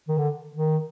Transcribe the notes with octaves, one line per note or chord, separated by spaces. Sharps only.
D#3
D3
D#3